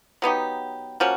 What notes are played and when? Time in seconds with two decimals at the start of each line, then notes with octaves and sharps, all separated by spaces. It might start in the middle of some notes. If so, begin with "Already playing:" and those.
0.22 F#3 B3 D#4 G4
1.00 F3 A#3 C#4 F#4